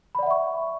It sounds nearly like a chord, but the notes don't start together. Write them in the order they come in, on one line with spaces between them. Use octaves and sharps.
B5 D5 F#5 E5 C#6